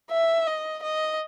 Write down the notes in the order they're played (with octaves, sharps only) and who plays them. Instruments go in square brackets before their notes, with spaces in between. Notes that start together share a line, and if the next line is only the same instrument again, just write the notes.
[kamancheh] E5
D#5
D#5